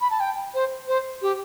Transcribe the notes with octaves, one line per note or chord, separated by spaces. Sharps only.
B5
A5
G5
C5
C5
G4